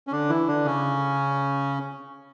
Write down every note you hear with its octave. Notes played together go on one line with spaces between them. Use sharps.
C#4
D3 D4
E3 E4
D3 D4
C#3 C#4